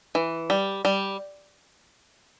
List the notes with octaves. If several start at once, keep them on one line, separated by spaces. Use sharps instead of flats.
E3
G3
G3